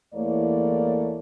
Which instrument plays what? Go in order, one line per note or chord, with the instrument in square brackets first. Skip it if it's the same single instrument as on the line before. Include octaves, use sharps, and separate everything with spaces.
[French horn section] E2 E3 A3 A#3 C#5 D5